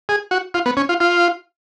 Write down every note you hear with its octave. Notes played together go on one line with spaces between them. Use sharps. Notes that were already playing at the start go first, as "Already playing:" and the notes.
G#4
F#4
F4
B3
C#4
F4
F4